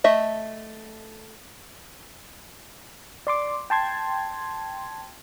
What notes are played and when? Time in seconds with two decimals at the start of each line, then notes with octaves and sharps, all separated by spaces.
0.04 A3 D#5 E5
3.27 D5 C6 D6
3.70 G5 A5 C6 G#6